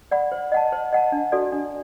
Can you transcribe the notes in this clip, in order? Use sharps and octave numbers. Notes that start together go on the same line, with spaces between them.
D5 F#5 B5
C5
D#5 F#5 A5
C5
D#5 F#5 A5
D4
F#4 A4 D5
D4